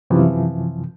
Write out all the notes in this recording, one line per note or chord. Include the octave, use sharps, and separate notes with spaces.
F#2 C3 E3 F3